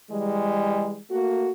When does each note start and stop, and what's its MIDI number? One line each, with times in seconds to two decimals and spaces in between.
0.11 0.98 52
0.11 0.98 55
0.11 0.98 56
1.10 1.50 57
1.10 1.50 58
1.10 1.50 66